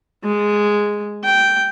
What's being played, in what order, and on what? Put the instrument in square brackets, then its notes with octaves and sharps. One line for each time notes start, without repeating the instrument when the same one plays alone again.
[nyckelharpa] G#3
G5